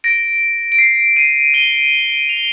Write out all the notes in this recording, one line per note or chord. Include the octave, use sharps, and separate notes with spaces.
A#6 D7
D7
C7
C7 D#7
D#7 G7
F7
G7